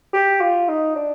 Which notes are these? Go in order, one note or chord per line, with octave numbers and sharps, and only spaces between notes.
G4
F4
D#4
D4